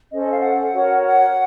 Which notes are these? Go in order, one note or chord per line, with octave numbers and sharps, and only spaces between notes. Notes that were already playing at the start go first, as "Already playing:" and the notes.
C#4 A4 C5 D#5
D#5
F5
F#5
F#4 A#4 C#5
F#5